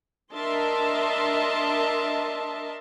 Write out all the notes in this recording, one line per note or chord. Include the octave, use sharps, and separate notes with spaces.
D4 A#4 D#5 E5 A5 C6